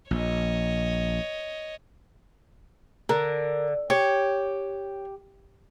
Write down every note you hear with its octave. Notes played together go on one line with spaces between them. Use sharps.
A#1 C#5 D#5
D3 A#4
G4 C#5